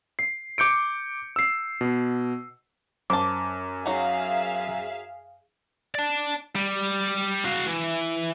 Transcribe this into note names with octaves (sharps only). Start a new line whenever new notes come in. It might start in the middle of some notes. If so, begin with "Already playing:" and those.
C7
D6 G6 C#7 D7
E6 C7
B2
F#2 C5 A5 D6
F#3 D#4 G#4 E5 F5
D5 A5
G3
F#4 F5
E3